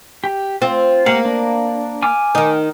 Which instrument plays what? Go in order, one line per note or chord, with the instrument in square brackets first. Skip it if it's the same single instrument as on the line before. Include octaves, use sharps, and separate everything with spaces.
[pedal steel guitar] G4
[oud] C4 [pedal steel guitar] F4
[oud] A#3 [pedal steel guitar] G4 F5 F#5
[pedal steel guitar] D4
G#5 D6 F6
[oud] D#3 D#4